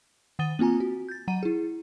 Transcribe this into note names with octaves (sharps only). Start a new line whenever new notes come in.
D#3 F#5 D#6 A6 D#7 G7
A#3 C4 F4 G#5 A#5
F#4
G6 A6
F#3 F#5 A#5 D#7
E4 G#4